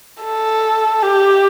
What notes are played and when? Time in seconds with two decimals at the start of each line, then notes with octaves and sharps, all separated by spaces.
0.23 A4
1.03 G4